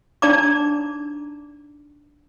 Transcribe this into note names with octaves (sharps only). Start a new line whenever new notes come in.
D4 D#4 D5 A5 A#5 D6